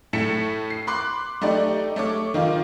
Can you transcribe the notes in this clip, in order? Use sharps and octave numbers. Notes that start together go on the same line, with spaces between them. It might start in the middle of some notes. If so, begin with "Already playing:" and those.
A2 A3 B6 C#7 E7
C7
B5 C6 D6 F#6
A3 D#4 G4 D5
A3 C#5 D6
D#3 D#4 F4